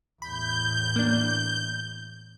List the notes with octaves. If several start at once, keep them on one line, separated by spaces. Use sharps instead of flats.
E2 A2 B5 G6
A#3 D4